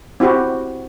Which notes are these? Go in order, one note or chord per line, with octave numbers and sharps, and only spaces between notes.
C4 E4 F#4 G4